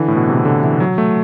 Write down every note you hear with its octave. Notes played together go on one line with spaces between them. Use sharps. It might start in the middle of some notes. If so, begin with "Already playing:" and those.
Already playing: D3 E3
A2
B2
C3
C3
D3
E3
F#3
A3